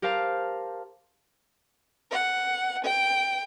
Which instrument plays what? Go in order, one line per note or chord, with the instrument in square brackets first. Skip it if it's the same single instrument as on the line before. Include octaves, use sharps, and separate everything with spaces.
[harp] G4 A#4 C5 F5 A5 A#5
[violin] F#5
G5